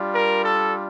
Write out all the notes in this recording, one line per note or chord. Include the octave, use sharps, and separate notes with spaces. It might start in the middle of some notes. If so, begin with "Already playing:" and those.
Already playing: G3 D4 F4
A#4
A4